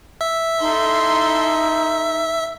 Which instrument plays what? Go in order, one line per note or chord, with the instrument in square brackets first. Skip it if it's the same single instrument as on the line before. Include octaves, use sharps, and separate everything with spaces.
[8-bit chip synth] E5
[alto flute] D#4 [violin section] E4 A4 C6